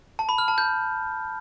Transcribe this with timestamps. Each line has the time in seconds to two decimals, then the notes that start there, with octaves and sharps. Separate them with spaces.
0.19 A5
0.29 B5
0.38 F6
0.48 A5
0.58 G6